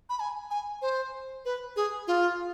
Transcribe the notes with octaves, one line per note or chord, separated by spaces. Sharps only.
B5
G#5
G#5
C5
B4
G#4
F4